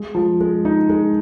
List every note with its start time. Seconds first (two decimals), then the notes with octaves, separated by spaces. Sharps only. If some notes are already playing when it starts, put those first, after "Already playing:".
Already playing: G#3
0.15 F3
0.41 G#3
0.65 D#4
0.90 G#3